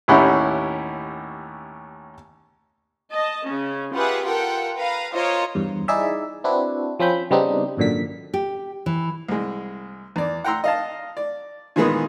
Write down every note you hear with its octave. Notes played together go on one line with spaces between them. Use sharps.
A1 D#2 C#4 E4 G4 F#5
D#5 A5
C#3 C#4
F4 G4 G#4 B4 E5 F#5
F4 A4 A#4 F#5 G5
B4 F5 A#5
F4 A#4 C5 C#5 D#5
E2 G2
D#4 E4 G#4 D5 E5
C4 D4 E4 F#4 B4
F3 C4 C#4 B5 G6
C#3 G3 B3 C4 D4 D#4
G#1 F#2 A#2 D3 B6
G4
E3
C2 G#3
E2 D5
F#5 G5 A#5 C6 E6
D#5 F5 A5
D5
A#2 D#3 E3 G#3 B3 G#4